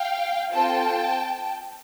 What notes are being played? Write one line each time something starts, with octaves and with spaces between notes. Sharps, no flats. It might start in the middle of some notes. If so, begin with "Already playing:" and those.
Already playing: F5 G5
C4 F4 A4 G5 A5